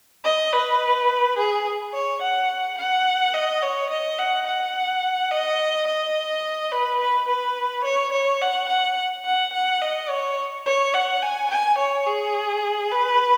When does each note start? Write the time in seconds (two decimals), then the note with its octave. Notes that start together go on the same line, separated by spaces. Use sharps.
0.25 D#5
0.53 B4
1.38 G#4
1.93 C#5
2.22 F#5
2.78 F#5
3.34 D#5
3.62 C#5
3.90 D#5
4.19 F#5
4.47 F#5
5.31 D#5
5.87 D#5
6.72 B4
7.00 B4
7.28 B4
7.84 C#5
8.13 C#5
8.41 F#5
8.69 F#5
9.25 F#5
9.53 F#5
9.82 D#5
10.09 C#5
10.66 C#5
10.94 F#5
11.22 G#5
11.51 G#5
11.78 C#5
12.07 G#4
12.91 B4